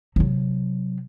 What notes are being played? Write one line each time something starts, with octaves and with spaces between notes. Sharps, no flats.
C3 F#3